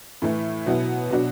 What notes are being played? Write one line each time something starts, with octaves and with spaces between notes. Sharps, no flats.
A2 E3 A3
B2 F#3 B3 E4
B2 F#3 D4 F#4